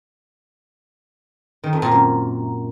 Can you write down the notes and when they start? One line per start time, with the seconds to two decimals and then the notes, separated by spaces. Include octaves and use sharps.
1.64 D#3
1.73 F2
1.82 A#2
1.91 F#2